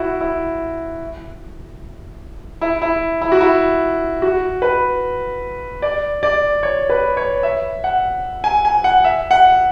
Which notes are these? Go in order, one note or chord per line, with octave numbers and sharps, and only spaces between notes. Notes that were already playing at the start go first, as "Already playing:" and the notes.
Already playing: E4 F#4
E4
E4
E4
E4
F#4
E4
F#4
B4
D5
D5
C#5
B4
C#5
E5
F#5
G#5
G#5
F#5
E5
F#5